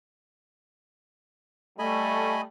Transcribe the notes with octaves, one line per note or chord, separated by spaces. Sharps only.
G3 A3 D#5 G#5 B5